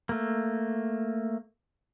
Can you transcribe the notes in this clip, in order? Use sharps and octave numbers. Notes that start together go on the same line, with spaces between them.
A3 A#3